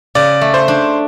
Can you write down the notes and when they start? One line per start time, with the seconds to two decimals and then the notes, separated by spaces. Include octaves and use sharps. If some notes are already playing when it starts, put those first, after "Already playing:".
0.15 C#3 D5
0.41 A3
0.54 C5
0.68 D4